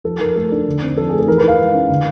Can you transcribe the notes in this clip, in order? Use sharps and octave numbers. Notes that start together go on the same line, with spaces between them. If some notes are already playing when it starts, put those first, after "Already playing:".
F3 A4
F3 A#4
A3 A4
D4
D3
C4
F3 A4
A3 G#4
A4
E3 A#4
B4
E4 F5
G#3
C#4
D3